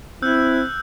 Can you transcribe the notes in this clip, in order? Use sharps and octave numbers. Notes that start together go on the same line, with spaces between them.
C4 E4 E6 F#6 G6